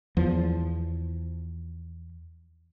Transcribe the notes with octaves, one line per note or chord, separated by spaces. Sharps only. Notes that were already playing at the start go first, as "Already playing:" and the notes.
E2 F3